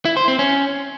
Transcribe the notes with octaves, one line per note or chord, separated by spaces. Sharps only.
E4
C5
C4
C#4